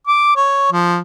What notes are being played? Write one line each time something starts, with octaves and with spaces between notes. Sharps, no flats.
D6
C#5
F3